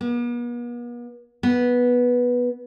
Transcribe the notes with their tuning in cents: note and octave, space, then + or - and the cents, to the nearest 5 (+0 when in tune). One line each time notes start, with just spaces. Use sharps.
B3 -45
B3 -10